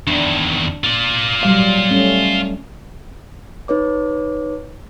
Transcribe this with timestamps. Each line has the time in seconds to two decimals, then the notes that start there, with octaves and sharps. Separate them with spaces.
0.07 E2 D#3 D4
0.84 F4 D5
1.43 F#3 G3 F5
1.89 G3 A3 C#4
3.68 D#4 B4 C#5 D6